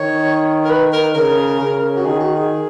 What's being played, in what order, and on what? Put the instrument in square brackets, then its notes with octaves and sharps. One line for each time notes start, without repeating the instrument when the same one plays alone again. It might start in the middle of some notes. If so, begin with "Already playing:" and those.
Already playing: [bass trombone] D#3 [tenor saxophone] C#5
[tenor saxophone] A#4
B4
A#4
[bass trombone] C#3 [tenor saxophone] A#4
[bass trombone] C#3
[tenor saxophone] F#4
[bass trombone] D#3 [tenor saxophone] G#4
[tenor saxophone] F#4
G#4